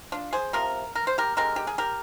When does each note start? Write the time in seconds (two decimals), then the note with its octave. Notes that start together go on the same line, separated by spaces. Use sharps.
0.12 D4 F4
0.33 G#4 C5
0.53 C3 F3 A#4
0.95 A#4
1.07 C5
1.18 G4 A#4
1.37 D3 G#3 G4 A#4
1.56 G4
1.67 G#4
1.78 G4 A#4